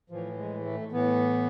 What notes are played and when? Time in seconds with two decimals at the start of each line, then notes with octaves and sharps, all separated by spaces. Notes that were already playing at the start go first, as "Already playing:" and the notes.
0.10 A2 E3 F3
0.37 G#3
0.65 A3
0.92 A2 E3 B3